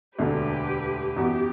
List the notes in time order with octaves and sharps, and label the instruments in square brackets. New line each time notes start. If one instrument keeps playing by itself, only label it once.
[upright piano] E1 D2 D3 A3 D4 [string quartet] G4 B4
[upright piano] F#2 E3 B3 F#4 [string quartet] G4